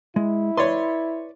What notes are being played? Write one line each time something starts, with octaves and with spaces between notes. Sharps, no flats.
G#3 E4
B4 C#5 D5 C6